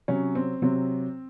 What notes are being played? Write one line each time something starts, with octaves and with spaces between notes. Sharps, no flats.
C3 F#3 C#4
C4
C3 F#3 C4